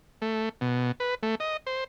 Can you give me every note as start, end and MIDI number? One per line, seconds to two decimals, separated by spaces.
0.22 0.49 57
0.61 0.92 47
1.00 1.15 71
1.23 1.35 57
1.40 1.57 75
1.67 1.84 72